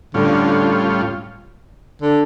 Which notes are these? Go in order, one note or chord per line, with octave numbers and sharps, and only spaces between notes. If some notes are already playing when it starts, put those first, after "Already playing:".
A2 D3 G3 C#4 F4
D3